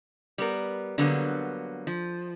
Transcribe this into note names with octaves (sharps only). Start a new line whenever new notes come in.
G3 B3 A#4
D3 F#3 G3 A#3 B3
F3